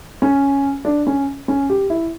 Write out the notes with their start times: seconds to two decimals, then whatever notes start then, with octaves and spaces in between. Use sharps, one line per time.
0.22 C#4
0.85 D4
1.07 C#4
1.48 C#4
1.70 G4
1.90 E4